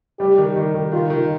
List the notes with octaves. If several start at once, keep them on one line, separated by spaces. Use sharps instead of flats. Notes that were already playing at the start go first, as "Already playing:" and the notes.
G3 G4
D#3
D#3
D#3
D#3 F4
D#3